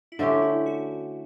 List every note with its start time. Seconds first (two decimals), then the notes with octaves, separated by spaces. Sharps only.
0.12 E4
0.19 D3 A3 C#4 D4 G4
0.42 E4
0.66 F#4